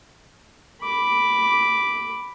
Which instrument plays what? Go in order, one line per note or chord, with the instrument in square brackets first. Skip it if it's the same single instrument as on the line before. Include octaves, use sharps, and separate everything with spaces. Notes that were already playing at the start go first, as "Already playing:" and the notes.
[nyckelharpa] B5 D6